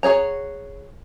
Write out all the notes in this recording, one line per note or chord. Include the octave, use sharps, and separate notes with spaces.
F#4 G#4 C#5 A#5